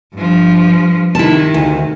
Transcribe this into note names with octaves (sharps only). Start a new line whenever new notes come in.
G2 F3
C3 D#3 E4 A5
D2